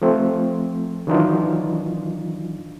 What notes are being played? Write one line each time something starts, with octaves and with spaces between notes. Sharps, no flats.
F3 A3 C4
D#3 E3 F#3 D4 D#4 F4